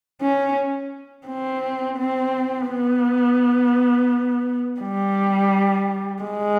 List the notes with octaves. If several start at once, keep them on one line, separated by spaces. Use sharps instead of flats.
C#4
C4
C4
B3
G3
G#3